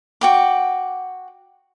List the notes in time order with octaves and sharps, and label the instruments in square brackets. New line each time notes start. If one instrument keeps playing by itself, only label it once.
[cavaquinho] F#4 G5 D6